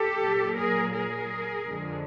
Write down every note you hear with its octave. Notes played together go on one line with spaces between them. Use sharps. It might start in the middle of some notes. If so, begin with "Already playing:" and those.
Already playing: G4 A4
A#2 F#3
G#4 A#4
G#4 A#4
F2 D3 F3 G#3